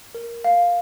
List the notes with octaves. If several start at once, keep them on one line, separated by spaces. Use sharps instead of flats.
A#4
F5